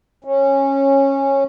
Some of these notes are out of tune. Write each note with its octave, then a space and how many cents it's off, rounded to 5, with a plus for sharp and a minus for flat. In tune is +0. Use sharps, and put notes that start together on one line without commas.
C#4 -15